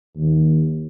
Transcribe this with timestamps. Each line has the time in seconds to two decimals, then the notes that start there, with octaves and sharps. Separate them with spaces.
0.16 D#2